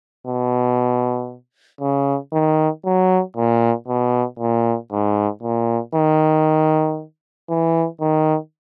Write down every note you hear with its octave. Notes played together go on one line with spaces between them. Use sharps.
B2
C#3
D#3
F#3
A#2
B2
A#2
G#2
A#2
D#3
E3
D#3